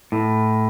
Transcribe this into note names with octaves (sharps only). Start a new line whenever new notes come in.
A2